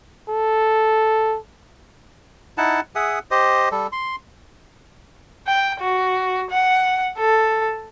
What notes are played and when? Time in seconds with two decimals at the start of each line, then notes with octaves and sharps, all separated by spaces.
0.29 A4
2.58 D#4 E4 F#5 A5
2.95 G#4 E5 F#5 D#6
3.31 G4 C5 D#5
3.72 G3 A4
3.92 C6
5.47 G5
5.80 F#4
6.51 F#5
7.18 A4